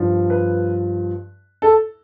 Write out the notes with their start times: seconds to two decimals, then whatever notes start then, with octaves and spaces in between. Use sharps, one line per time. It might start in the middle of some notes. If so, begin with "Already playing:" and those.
Already playing: G2 F3
0.30 B4
1.62 A4